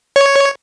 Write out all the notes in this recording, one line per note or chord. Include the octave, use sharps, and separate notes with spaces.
C#5